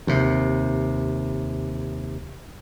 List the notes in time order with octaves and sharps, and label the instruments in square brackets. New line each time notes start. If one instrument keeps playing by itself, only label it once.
[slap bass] D#2 C3